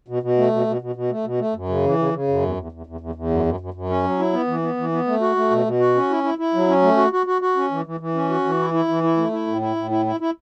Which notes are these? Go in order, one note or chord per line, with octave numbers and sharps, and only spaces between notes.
B2
B2
A3
B2
B2
B2
B2
A3
B2
A3
F#2
C#3
E3
C#3
C#3
F#2
E2
E2
E2
E2
E2
E2
F#2
F#2
F#2
F#2
C#4
F#3
E4
B3
E3
B3
E3
B3
A3
F#4
A3
B2
B2
F#4
C#4
E4
E4
E4
F#3
C#4
A3
F#4
F#4
F#4
F#4
C#4
E3
E3
E3
C#4
F#4
E3
E4
E4
E3
E4
A3
E4
A2
E4
A2
E4
E4
E4